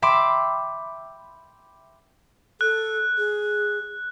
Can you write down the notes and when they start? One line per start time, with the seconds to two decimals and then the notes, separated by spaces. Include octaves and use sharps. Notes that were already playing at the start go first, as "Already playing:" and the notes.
0.02 E5 G5 B5 C6 D6
2.61 A4 F#6
3.18 G#4